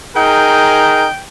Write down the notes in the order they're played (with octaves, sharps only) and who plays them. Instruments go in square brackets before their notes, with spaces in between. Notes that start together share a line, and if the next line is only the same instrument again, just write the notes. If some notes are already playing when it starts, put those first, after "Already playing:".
[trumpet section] D#4 G#4 A#4 [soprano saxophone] G5